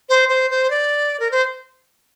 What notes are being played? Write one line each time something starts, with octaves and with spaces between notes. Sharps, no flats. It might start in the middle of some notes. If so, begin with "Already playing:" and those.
C5
C5
C5
D5
A#4
C5